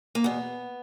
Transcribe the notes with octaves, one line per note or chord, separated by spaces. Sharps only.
A#3
E2 B2 B3